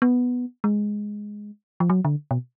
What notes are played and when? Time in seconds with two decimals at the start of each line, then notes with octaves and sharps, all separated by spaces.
0.02 B3
0.64 G#3
1.80 F3
1.90 F#3
2.05 D3
2.31 B2